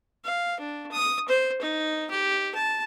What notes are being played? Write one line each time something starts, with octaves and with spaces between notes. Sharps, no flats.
F5
D4
D#6
C5
D#4
G4
A5